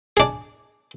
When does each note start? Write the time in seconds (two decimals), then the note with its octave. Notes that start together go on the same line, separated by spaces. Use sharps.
0.17 D4 G#4